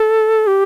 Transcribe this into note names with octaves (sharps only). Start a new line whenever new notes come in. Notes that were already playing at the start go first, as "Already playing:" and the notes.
Already playing: A4
G4